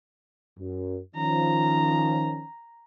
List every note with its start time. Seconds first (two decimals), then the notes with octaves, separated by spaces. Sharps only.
0.59 F#2
1.16 D#3 F3 C#4 A#5